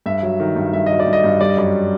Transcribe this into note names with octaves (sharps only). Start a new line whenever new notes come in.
G2 E5
F#3
D#3
G2
G2 E5
F#3 D#5
D5
G2
D#5
G2
G3 D5
D#5
F#2 D5